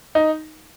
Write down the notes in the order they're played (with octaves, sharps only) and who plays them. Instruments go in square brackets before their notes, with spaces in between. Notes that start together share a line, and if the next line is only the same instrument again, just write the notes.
[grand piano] D#4